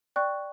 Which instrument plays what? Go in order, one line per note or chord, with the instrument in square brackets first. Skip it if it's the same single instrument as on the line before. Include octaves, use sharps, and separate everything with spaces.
[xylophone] D5 G5 C#6 F#6